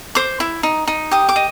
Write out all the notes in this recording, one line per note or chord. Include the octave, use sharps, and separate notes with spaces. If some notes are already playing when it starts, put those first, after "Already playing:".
C5 D6
E4
D#4
D#4
G4 D#6
D6
D#5